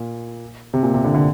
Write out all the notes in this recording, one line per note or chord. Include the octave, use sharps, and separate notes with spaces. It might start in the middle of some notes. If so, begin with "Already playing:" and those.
Already playing: A#2
C3
A#2
C3
D3
D3